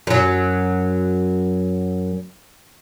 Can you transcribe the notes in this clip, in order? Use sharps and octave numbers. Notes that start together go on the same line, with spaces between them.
F#2 F#3